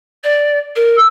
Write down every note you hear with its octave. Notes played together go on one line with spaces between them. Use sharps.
D5
A#4
E6